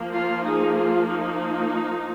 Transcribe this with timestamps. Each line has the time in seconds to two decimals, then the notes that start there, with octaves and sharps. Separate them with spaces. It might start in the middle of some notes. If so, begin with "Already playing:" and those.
Already playing: F3 A#3
0.15 F4
0.46 D#4 G#4
0.77 F4
1.07 D#4